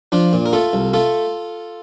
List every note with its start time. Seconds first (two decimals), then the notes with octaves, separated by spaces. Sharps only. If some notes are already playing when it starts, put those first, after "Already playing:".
0.12 F3 D4 F4
0.33 A#2
0.46 A#4
0.53 A3 F4 A4
0.73 C2
0.93 A3 F4 A4